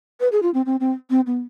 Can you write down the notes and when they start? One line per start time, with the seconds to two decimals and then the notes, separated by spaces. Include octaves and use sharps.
0.20 B4
0.32 G#4
0.42 F4
0.54 C4
0.66 C4
0.80 C4
1.10 C4
1.26 B3